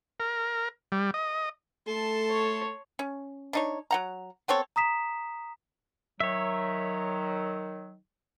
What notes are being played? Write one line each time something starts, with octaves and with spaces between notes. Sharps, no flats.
A#4
G3
D#5
A3 A4 A5 C6
C#5
C#4
D4 D#4 C#5
F#3 F#5 A#5
B3 C4 A4 C#5
A#5 D#6 B6 E7
D#3 F#3 C#5 E5